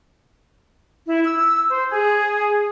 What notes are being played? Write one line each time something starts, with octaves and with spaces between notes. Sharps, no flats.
E4
E6
C5
G#4